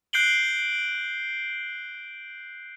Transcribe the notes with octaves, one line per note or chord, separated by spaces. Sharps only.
F#6 G6 C7 D7 F#7 G7